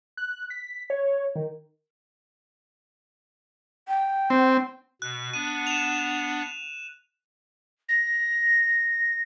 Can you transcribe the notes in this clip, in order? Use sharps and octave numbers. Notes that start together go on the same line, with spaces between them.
F#6
B6
C#5
D#3
G5
C4
B2 F#6
B3 D4 F#5 D#7
E7 F7
A#6